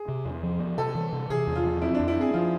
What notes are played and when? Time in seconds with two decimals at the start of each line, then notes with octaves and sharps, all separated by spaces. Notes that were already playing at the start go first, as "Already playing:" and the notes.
Already playing: G#4
0.08 C3
0.25 E2
0.43 F3
0.60 B3
0.78 C3 A4
0.95 E3
1.13 C3
1.30 C3 G#4
1.47 E2
1.55 F4
1.65 F3
1.82 C4 E4
1.95 F2 D4
2.08 E4
2.17 C4 G#4
2.34 F3 F4